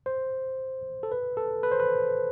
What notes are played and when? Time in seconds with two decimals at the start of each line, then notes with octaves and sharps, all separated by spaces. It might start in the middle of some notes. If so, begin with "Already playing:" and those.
0.06 C5
1.03 A4
1.12 B4
1.37 A4
1.63 B4
1.72 C5
1.80 B4